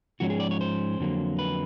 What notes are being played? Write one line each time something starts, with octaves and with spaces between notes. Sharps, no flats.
G#2 F3 G#3 C#4 F#4
G#4
D5
C#5
C5
F2 D3 F#3 A#3
B4